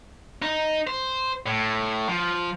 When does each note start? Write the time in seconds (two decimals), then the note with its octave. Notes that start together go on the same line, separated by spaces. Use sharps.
0.42 D#4
0.87 C5
1.46 A2
2.09 F3